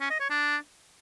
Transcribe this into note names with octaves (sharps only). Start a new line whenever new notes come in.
C#4
D#5
C#5
D4